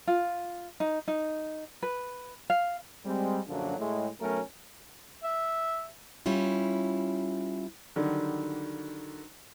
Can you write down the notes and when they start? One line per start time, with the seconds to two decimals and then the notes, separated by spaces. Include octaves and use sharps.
0.08 F4
0.80 D#4
1.08 D#4
1.83 B4
2.50 F5
3.05 G3 G#3 C4
3.47 A#1 F#2 D3 F#3 A#3 D4
3.78 A2 G#3
4.20 B1 F#3 A3 C#4 A#4
5.23 E5
6.26 G3 C#4 E4 F4
7.96 D3 D#3 F#3 G3